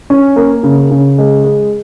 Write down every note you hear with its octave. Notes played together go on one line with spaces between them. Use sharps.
C#4
A#3
C#3
C#3
G#3
G#3